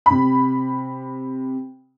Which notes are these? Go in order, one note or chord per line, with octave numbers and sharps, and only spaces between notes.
C3 B5